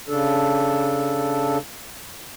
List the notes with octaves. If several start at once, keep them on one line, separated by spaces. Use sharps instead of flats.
C#3 D4 A4